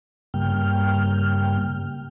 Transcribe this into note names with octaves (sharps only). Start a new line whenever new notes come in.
G2 C#3 G3 A#3 G5 F6